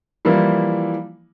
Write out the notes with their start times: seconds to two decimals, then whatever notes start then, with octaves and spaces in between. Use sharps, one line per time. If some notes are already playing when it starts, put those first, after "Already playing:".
0.25 E3 F3 G3 A#3 E4